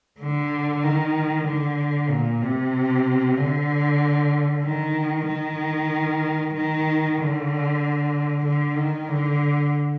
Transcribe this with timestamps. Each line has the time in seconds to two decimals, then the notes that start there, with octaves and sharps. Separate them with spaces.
0.20 D3
0.83 D#3
1.47 D3
2.10 A#2
2.42 C3
3.37 D3
4.64 D#3
5.28 D#3
6.55 D#3
7.18 D3
8.45 D3
8.77 D#3
9.08 D3